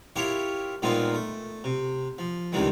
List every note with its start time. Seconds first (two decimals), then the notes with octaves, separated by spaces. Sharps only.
0.16 E4 F4 G4 A#4 C#5
0.82 A#2 D#3 G#3 B3 C4 F4
1.14 A3
1.64 C3
2.18 F3
2.52 C#2 C3 D#3 E3 G3 G#3